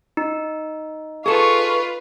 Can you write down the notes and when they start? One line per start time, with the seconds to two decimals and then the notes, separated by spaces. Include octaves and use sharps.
0.17 D#4
1.26 F4 G#4 A4 B4 C#6